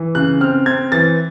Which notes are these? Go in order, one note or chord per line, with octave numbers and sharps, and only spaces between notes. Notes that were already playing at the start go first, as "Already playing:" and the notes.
Already playing: E3
C#3 F#6
C4 F6
C4 G#6
E3 A6